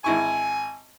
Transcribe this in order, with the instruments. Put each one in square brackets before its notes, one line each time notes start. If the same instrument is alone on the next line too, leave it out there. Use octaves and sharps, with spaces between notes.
[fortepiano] G#1 E4 C#6 [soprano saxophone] G#5